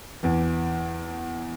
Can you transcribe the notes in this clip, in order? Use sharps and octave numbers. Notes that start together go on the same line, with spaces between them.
E2 E3